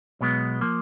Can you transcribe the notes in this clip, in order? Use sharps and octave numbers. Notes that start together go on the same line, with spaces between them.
B1 B2 G#3 B3
F3 A#3